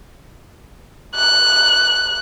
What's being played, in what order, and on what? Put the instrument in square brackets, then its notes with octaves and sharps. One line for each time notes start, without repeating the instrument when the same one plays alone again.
[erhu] F#6